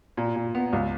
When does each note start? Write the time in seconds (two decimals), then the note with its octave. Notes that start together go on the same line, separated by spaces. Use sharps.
0.17 A#2
0.36 A#2
0.55 B3
0.73 C#2